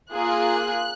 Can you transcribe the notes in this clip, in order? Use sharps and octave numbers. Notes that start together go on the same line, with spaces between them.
A#3 F4 G#4 F#6